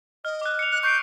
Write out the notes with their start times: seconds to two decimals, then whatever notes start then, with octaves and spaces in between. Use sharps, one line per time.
0.25 D#5 F6
0.41 D6 F#6
0.59 C#7 F7
0.71 F#6
0.83 C#6 G6 C7 D7